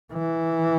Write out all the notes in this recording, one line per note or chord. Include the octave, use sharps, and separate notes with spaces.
E3